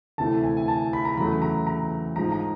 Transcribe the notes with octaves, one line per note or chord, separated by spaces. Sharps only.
D2 C3 E3 A3 A5
G#5
G#5
A5
B5
A#5
E2 C#3 F#3 A3 B5
A#5
A#5
G#2 F3 G#3 A#5
A#5